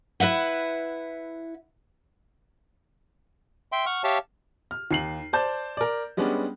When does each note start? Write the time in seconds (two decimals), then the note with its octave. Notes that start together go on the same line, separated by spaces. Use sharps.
0.20 E4 B4 E5 F#5
3.72 E5 G5 C6
3.86 F#5 C#6 F6
4.04 G4 C#5 E5 F5 A5
4.71 F6
4.91 D#2 C7 F#7
5.33 C5 D5 A5 G6
5.77 A#4 D5
6.17 G3 G#3 B3 C#4 D4